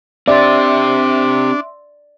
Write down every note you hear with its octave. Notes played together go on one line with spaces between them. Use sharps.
C4 D4 G4 D5 E5 C6